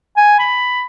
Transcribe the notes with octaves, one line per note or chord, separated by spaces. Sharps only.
G#5
B5